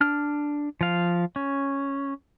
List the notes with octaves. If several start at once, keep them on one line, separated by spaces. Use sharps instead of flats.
D4 F6
F3 F5
C#4